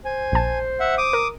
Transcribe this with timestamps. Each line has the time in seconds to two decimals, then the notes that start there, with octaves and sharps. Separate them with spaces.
0.05 C5 G#5
0.32 A#1 A5
0.80 E5 F#5
0.98 D6 D#6
1.13 A#4